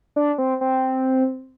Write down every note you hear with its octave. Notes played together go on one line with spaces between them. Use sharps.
D4
C4
C4